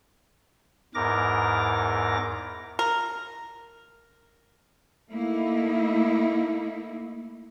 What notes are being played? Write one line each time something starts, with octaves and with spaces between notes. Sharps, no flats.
E2 G#2 A#4 D6 A#6
A#4
A3 A#3 D#4 E4